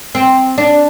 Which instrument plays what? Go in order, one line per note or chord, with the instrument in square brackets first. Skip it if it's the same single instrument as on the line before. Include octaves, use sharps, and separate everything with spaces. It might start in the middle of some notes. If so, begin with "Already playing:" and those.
[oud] C4
D4